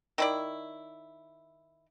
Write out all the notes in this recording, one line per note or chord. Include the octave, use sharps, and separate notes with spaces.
D#3 E4 D5